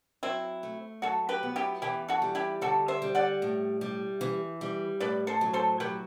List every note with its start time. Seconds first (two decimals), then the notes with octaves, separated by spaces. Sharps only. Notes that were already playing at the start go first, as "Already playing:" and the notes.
0.23 F#3 C4 E4
0.63 A3
1.02 F#3 F#4 A4
1.29 G4 B4
1.43 B3
1.56 E4 G4
1.82 E3 E4 G4
2.08 F#4 A4
2.22 G3
2.35 E4 G4
2.61 D3 F#4 A4
2.88 C5 E5
3.02 G3
3.15 D5 F#5
3.42 A2
3.81 G3
4.21 E3
4.61 G3
5.00 A2 B4 D5
5.27 A4 C5
5.41 F#3
5.53 A4 C5
5.80 F#3 G4 B4